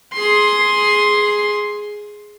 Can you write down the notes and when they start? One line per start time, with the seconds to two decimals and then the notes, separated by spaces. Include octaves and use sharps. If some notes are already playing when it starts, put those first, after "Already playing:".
0.14 G#4 C6